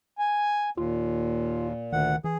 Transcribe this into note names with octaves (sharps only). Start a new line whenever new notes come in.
G#5
D#2 A#2 F4
D2 D#3 F#5
E3 G#4